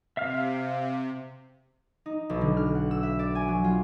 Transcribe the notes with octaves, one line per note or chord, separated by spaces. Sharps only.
C3 E5 F5 F6
D#4
B1
D3
F6
F#5
E6
E5
D5
G#5
F#3
F4